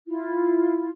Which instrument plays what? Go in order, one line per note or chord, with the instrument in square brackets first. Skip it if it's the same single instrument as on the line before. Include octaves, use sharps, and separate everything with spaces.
[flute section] E4 F4